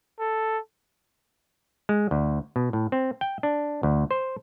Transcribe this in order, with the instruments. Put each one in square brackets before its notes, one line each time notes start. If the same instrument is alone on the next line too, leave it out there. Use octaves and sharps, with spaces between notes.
[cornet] A4
[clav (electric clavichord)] G#3
D2
B2
A2
C4
G5
D4
D2
C5